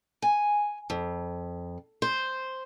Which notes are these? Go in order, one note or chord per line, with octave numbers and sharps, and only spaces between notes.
G#5
F2
C5